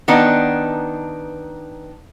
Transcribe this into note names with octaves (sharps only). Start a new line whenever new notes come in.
D#3 B3 D4 D#4